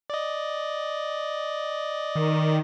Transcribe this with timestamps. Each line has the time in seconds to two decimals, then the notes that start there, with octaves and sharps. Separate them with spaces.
0.10 D5 D#5
2.15 D#3